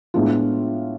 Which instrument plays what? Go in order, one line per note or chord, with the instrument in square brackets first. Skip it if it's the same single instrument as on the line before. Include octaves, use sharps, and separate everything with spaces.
[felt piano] A2 G#3 B3 D4 F4